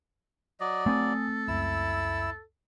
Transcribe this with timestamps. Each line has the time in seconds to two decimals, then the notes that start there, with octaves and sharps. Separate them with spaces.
0.60 F#3 D5 D#5
0.86 A3 C4 A4 G#5 D#6
1.48 C#2 F#2 E4 E6